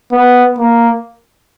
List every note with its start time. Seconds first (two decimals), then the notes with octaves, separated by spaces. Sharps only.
0.12 B3
0.58 A#3